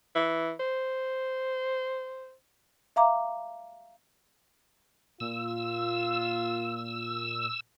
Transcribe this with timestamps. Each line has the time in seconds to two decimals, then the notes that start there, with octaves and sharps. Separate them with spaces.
0.15 E3
0.60 C5
2.96 E5 F5 A#5 D6
5.20 A#2 F4 E6